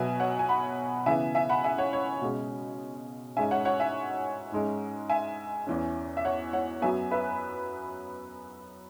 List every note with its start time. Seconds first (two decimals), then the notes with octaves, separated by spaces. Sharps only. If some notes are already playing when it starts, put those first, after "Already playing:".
Already playing: B2 F#3 B3 E5 G#5
0.20 C#5 F#5
0.39 G#5
0.49 F#5 B5
1.06 C#3 E3 B3 E5 G#5
1.35 E5 G#5
1.49 F#5 B5
1.64 E5 G#5
1.78 C#5 F#5
1.93 C#5
2.22 B2 G#3 C#4
3.36 G#2 G#3 C#4 E5 G#5
3.51 C#5 F#5
3.65 C#5 F#5
3.80 E5 G#5
4.52 G#2 G#3 C#4
5.09 E5 G#5
5.67 E2 E3 C#4
6.17 E5
6.25 C#5 F#5
6.53 C#5 F#5
6.82 F#2 F#3 B3 E5 G#5
7.11 B4 E5